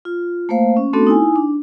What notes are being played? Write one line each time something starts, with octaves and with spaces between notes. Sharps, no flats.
F4
A3 A#3 C5 F5
C#4
A3 B3 C4 D4 F#4 A4
D#4 E4 G#5
D4